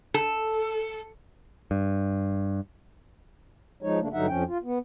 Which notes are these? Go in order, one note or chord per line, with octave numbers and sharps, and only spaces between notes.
A4
G2
F3 G#3 D#4 C#5
C#3 A3 A#3 D4
G2 D3 F#3 D#4 E5 F#5
F2 F3 C#4 G5
F4
B3